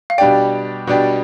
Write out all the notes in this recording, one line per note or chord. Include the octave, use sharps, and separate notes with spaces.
F5
B2 G3 D4 G4 D5 G5
B2 G3 D4 G4 D5